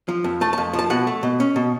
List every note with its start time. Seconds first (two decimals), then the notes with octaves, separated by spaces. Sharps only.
0.09 F3
0.24 F2
0.41 A3 A5
0.53 A5
0.58 F2
0.73 F3
0.79 A5
0.90 B2 F#5
1.07 A3
1.23 B2
1.40 C#4
1.56 B2